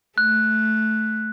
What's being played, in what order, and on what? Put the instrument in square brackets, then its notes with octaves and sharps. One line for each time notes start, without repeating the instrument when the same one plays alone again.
[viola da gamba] A3 [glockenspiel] F#6